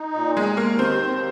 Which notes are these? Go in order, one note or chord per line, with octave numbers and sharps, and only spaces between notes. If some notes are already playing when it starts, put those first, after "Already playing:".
Already playing: D#4
A#2
D#2 G#3
D#2 A#3
D#3 C4
D#2